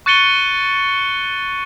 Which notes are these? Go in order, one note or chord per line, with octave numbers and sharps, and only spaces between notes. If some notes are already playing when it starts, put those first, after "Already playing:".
C#6 F#6 A6 C#7 D#7 G7